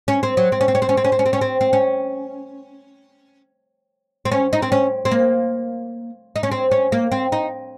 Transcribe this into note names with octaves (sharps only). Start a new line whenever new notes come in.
C#4
C4
F#3
C4
C#4
C4
C#4
C4
C#4
C4
C#4
C4
C#4
C4
C#4
C4
C4
C#4
C4
C#4
D#4
C4
C#4
C4
A#3
D#4
C#4
C4
C#4
A#3
C4
D#4